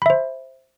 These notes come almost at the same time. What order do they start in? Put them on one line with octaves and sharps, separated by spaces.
B5 E5 C5